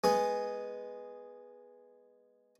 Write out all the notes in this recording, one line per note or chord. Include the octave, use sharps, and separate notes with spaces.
G#3 B3 G#4